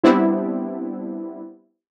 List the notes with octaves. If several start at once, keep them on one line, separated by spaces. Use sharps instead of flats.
G3 B3 C4 D4 E4